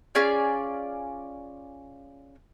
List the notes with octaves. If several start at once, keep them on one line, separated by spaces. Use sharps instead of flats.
C#4 F4 G#4 D5